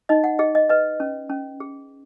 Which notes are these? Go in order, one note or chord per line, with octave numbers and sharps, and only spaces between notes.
D#4 D#5
F#5
G#4 D#5
D#5
B4 D#5
C#4
C#4
G#4